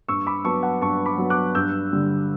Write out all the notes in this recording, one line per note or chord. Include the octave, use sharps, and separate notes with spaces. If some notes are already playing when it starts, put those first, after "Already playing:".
G2 C#6 E6
B5 D6
F#3 B3 A5 C#6
F#5 A5
G2 A5 C#6
B5 D6
F#3 B3
D6 F#6
G2 E6 G6
D3 G3